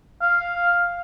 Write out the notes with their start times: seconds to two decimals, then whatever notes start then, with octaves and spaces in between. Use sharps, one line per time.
0.22 F5